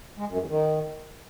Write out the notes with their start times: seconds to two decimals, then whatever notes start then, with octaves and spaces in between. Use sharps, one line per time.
0.18 G#3
0.28 F#2
0.39 E2
0.49 D#3